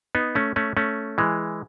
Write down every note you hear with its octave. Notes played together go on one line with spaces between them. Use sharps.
B3 D#4
A3 C#4
A3 C#4
A3 C#4
E3 G#3